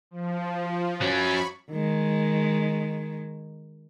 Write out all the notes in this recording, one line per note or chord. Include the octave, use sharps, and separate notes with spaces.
F3
F#3 C#4 B5 C#6
D#3 G#3